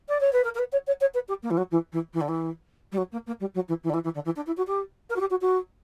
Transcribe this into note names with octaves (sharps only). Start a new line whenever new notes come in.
D5
C#5
B4
A#4
A#4
B4
C#5
C#5
C#5
B4
G4
A#3
E3
F#3
E3
E3
E3
D3
E3
G3
F#3
A#3
A#3
G3
F#3
E3
E3
D3
E3
E3
D3
E3
D4
E4
F#4
G4
A#4
F#4
G4
F#4
F#4